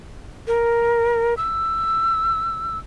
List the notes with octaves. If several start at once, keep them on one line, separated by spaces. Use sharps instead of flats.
A#4
E6